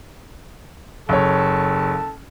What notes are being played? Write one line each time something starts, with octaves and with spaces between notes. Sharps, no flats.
F#1 A4 C#5